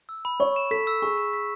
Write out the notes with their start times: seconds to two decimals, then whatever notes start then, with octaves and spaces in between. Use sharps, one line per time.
0.09 E6
0.25 B5
0.40 C#5 C#6
0.56 E7
0.71 A4 B6
0.87 E6
1.02 G#4 C#6
1.18 E7
1.33 B6